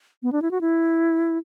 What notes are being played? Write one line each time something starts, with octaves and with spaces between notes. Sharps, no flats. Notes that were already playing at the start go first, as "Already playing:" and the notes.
B3
D4
E4
F#4
E4